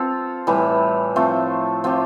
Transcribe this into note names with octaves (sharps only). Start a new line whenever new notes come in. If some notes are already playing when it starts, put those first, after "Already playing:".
Already playing: C4 F4 A4
A2 E3 G3
F3 A3 C4
F3 C4 G4